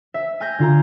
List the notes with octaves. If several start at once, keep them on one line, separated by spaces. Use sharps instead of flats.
E5
G#5 F6 G6 G#6 A#6
D3 F4 A#5